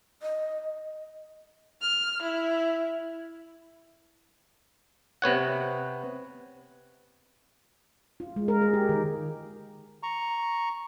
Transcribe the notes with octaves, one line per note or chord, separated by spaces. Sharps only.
D#5
F6
E4
C3 B3 C#5 F#5
F4
G#3
A#4
G#4
G4
D#3
A#5 C#6